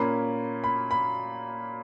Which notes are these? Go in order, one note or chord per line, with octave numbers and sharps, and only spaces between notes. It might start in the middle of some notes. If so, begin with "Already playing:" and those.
Already playing: A#2 A#3 C#4 B5
B5
B5